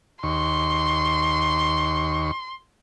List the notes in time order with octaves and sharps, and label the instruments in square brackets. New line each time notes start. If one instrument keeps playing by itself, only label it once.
[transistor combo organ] D#2 C#6 [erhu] C6